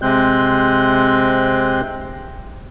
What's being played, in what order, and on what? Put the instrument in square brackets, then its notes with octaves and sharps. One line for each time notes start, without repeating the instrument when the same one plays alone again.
[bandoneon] C3 G#3 C4 F#6 G6